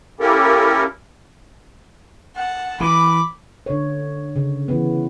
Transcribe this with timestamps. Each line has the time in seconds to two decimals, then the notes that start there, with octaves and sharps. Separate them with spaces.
0.20 A#3 C#4 E4 G4 A4 A#4
2.36 F#5 A5
2.81 E3 B5 D6
3.66 D3 C#5
4.36 C#3
4.68 E3 B3